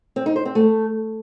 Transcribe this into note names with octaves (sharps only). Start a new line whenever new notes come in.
C4
D#4
C5
C4
A3